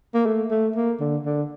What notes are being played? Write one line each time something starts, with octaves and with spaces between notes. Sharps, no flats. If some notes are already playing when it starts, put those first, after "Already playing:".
A#3
A3
A3
A#3
D3
D3